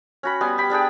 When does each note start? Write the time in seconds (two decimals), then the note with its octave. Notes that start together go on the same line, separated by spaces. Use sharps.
0.23 C#4 F#4 B5
0.41 G3 B3 G#5 C6
0.58 G4 B5
0.70 G3 D4 G#4 G5